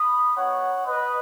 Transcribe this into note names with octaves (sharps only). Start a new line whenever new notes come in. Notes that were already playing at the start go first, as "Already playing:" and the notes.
Already playing: B5 D#6
B3 D#4 F#4 C#5 F#5
B4 D#5